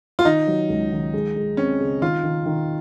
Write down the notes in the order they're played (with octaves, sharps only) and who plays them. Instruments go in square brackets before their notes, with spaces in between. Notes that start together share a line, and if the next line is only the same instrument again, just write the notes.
[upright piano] F4
[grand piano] D#3 [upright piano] D#4
[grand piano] F#3
C#2
D#3
G#3
G#3
[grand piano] C4 [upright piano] C#4
[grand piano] C#3
[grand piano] D#3 [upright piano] F4
[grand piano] D#3
D#3